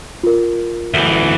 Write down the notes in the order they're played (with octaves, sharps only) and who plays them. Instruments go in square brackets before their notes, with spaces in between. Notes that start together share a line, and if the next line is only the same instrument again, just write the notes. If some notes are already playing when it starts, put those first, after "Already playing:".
[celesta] F4 A#4
[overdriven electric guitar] D2 E3